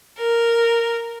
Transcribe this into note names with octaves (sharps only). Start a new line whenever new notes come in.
A#4